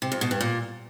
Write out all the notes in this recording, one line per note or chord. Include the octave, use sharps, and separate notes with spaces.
C3
F2
B2
G2
A#2